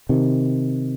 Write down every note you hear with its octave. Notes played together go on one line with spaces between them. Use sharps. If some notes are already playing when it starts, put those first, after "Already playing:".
C3 D#3